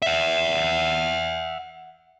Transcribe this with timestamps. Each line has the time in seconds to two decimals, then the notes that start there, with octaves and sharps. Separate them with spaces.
0.02 E5 F#5